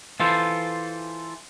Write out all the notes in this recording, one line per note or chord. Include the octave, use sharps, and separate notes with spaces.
E3 F4 A4 C5